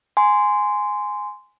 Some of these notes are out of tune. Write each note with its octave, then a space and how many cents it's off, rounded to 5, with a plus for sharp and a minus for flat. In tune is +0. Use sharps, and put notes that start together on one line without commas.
G#5 +0 C6 -15